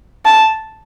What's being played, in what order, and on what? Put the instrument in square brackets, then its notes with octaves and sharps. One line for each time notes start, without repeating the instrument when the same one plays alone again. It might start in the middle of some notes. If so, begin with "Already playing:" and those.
[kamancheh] A5